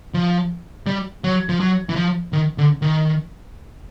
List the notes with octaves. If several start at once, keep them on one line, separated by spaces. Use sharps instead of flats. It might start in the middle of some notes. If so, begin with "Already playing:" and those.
F3
G3
F#3
F3
F#3
E3
F3
D#3
D3
D#3